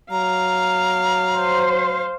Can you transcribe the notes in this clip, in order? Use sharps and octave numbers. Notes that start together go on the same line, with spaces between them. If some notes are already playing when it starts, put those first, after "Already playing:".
F#3 F5 A#5
C5